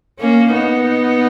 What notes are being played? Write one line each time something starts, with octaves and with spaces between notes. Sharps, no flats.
A#3 C#4
B3 D#4